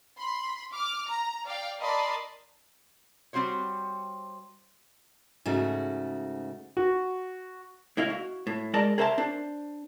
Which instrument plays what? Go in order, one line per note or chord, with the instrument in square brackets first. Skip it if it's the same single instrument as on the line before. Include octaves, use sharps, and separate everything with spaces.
[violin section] B5 C6
D6 F6
A#5
D5 F5 G5
A#4 D5 D#5 A5 B5 C6
[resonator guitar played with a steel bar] G3 C4 F#4 C5 C#5
[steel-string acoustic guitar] G#2 C#3 A3 F#4
[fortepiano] F#4
[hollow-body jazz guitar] A2 E4 D#5 F5
F#4
A2
G#3 A#4 D5 D#5 A5 A#5
G#4 A#4 C5 E5 F#5 A5
D4 C5